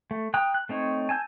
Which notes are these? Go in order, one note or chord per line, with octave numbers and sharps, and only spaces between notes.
A3
G5 A#5 D#6 F#6
F#6
A3 C4 D#4 C#5
G#5 A5 E6 G6